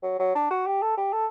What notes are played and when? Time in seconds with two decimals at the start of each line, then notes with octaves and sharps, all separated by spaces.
0.03 F#3
0.19 F#3
0.35 D4
0.50 F#4
0.66 G4
0.82 A4
0.97 G4
1.12 A4